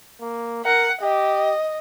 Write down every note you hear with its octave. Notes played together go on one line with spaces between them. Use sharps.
A#3
A#4 F#5
G4 D#5